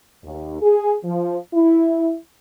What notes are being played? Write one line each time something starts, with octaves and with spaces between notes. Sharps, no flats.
D#2
G#4
F3
E4